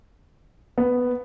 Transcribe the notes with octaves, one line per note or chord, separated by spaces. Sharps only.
B3